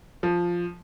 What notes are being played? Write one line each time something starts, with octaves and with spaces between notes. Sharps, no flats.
F3